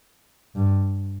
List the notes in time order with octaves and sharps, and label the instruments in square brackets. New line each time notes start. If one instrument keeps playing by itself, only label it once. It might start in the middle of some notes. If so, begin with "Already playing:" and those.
[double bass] G2